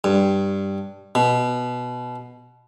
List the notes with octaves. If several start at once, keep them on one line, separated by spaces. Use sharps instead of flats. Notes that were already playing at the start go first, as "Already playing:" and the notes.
G2
B2